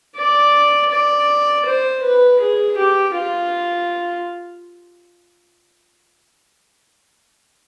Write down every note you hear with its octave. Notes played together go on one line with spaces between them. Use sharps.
D5
D5
C5
B4
G#4
G4
F4